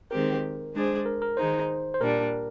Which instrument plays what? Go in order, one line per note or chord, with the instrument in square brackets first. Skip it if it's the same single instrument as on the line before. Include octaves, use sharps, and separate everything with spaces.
[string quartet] D#3 G#3 C4 G4 [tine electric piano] A#4
[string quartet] G#3 D4 G#4 C5
[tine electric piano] A#4
A#4
[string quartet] D#3 G#3 D#4 [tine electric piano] C5
[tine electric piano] C5
[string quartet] A#2 G3 D4 [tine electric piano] A#4